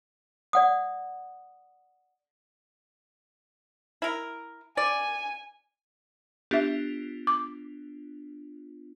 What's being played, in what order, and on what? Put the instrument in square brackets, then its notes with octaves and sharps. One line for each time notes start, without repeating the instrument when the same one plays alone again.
[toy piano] D5 F#5 D#6
[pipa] E4 A#4
[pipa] D5 [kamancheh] G#5
[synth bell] B3 D4 F4 [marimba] G4 E5
[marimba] D6